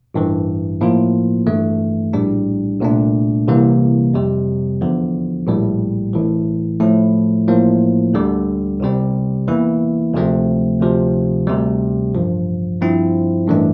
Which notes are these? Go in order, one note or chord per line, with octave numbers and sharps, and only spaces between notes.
A1 G2 E3
A2 F3 A#3 F4
G1 G2 E3 A3
A#1 A2 G3 D4
C2 A#2 A3 D4
C2 C3 E3 A#3
F2 C3 G3
E2 D3 F3
A#1 A2 G3
A1 A2 E3
A2 F3 A3 E4
A1 A2 F3 A#3
D2 D3 G3
C2 C3 G3 C4
E2 E3 A#3 E4
D2 C3 F3 A3 C4
D2 C3 F3
D2 C3 G3
A1 G2 F3
G2 F3 C4 E4
A1 G2 E3 A3 D4